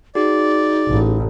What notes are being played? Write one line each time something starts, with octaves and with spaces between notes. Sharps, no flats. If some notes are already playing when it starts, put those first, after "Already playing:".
D#4 F#4 G#4 D5
A1